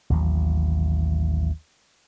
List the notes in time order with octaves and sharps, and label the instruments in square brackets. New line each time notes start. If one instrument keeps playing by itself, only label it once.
[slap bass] A1 D#2 F#3